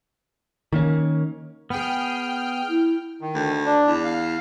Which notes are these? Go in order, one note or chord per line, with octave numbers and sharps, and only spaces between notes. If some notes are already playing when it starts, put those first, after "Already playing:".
D#3 A#3 C#4
B3 G#4 G5 F6
E4
D#3
D2
D4
E2
F5